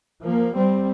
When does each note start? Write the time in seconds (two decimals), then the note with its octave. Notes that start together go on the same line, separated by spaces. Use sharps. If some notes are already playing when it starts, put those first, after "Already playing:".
0.23 F3 A#3
0.54 G3 C4